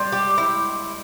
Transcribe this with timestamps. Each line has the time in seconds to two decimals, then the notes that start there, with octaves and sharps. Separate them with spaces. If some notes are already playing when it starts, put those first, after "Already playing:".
Already playing: G3 C6 G6
0.12 G4
0.38 E4